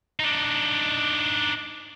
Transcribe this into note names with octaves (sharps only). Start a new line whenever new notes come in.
D4 D#4